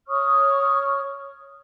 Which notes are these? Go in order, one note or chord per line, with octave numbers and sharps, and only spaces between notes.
C#5 C#6 D#6 F6